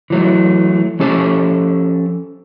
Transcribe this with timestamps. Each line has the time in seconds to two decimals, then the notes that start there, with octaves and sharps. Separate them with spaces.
0.10 E3 F#3 A3
0.99 F3 C#4 G4 A4